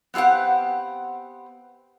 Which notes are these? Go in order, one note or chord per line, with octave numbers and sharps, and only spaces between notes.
B3 C4 G4 F5 F#5